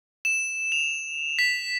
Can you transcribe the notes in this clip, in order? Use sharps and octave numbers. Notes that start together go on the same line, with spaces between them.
E7
F7
B6